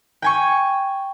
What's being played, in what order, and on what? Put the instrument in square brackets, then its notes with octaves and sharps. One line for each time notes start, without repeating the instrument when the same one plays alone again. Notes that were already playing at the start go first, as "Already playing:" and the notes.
[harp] G5 G#5 C#6